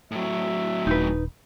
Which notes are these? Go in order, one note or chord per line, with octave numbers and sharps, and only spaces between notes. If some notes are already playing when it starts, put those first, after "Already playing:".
A2 F#3 E5
D#1 D#4 B4